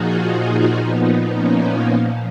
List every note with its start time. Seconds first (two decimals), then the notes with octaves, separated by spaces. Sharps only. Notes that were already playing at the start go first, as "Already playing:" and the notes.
Already playing: A#2 F3 D#4 F4 F#4 G#4
0.18 D#4 F#4
0.75 A#2 F3 B3 D#4
1.32 A#3 C#4
1.89 A#2 F3